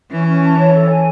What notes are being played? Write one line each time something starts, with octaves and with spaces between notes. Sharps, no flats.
E3 C#4
C#4
A5
C#5
A4
G#5